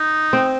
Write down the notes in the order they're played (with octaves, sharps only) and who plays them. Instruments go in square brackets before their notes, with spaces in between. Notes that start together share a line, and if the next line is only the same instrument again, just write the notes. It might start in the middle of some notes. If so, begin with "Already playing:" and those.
Already playing: [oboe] D#4
[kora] C4